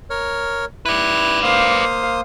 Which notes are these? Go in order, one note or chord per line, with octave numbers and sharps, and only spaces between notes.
A#4 C#5 F6
E4 B4 D5 F#6
A#3 C5 F5 D#6